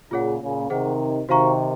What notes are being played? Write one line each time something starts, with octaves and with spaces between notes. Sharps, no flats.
A#2 C#3 F4 G#4 C#5 F#5
A#2 C#3
C3 D#3 G#4 C5 F#5
C3 D#3 F#4 C5 F5 A#5 C#6